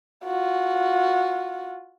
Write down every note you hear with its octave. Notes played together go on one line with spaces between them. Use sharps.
F4 F#4